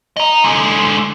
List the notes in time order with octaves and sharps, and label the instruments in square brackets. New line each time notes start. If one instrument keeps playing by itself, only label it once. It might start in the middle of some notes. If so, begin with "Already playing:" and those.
[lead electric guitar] D#5 A#5
D3 G#3